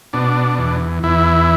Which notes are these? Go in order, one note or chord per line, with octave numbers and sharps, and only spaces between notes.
B2 D4
E2
E2 E4